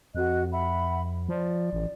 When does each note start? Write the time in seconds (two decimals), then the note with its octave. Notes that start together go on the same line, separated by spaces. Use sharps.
0.15 F2 F#4 D#5 F#6
0.52 E5 F#5 B5
1.28 F3 D5
1.73 A1